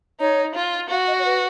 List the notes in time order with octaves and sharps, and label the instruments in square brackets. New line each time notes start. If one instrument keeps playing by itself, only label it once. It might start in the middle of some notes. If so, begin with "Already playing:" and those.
[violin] D#4 [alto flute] C#5
[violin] F4
[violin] F#4 [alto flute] F5
[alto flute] D#5
C#5
B4